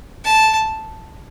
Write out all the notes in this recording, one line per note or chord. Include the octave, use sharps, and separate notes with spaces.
A5